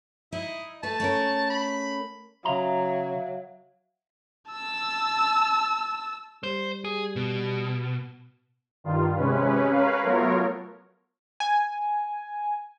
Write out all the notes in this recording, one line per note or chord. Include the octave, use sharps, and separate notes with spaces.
D#4 E4 D#5
A3 B4 A5
A3 C#4 A#4
B5
C#3 F#3 E5 F5 A#5
A5 E6
G3 C5
G#4
B2
G2 D#3 F4
C3 G#3 C#4 B4
A#4 B4 C#5 F5
F#3 A3 B3 F4 A#4 C#5
G#5